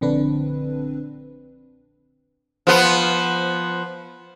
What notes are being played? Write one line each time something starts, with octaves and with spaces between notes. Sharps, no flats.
A#1 D3 C4 D4 B4
F3 B3